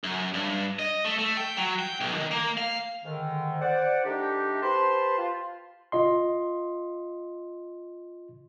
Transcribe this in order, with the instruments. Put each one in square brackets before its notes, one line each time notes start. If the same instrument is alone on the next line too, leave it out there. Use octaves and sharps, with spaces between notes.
[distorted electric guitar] F#2
G2
D#5
A3
A3
G5
F#3
G5
B1
D#3
A#3
F5
[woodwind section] G#2 D3 D#3
C5 D5 F#5
D#3 A3 D4 D#4 G4
G4 B4 C5 A5 B5 C6
F4
[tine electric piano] F4 D#5 C6